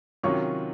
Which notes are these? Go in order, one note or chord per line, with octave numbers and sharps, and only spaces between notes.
C3 D#3 F#3 C#4 F4 C#6